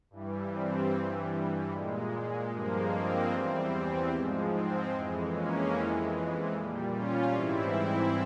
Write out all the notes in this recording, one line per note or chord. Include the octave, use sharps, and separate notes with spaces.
G2 E3 G3
C4
G2 E3 G3
A#2 G#3
G2 F3 G#3 A#3
C4
E2 E3 G3 C4
G#2 F3 G#3
C4
F2 E3 G#3
A#3 C#4
F2 E3 G#3
A#2 G3
C#4 F4
G#2 E3 G3 C4 E4
C4 E4